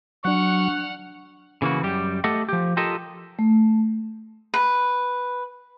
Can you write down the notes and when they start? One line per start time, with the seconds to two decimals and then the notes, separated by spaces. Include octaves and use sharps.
0.25 F#3 D4 F#5 C#6 F6 F#6
1.62 C#3 E3 A#3 F#4
1.83 F#2 G3 G4
2.24 A3 G4 A4 D#5 F#5
2.49 F3 G4
2.77 F4 G4 A4 A#4 D#5
3.39 A3
4.54 B4